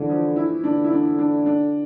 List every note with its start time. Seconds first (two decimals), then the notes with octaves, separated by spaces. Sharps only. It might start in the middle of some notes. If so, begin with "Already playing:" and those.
Already playing: D3 E3
0.09 F3
0.36 E4
0.64 D3 D4
0.84 E4
0.92 D4
1.19 D4
1.46 D4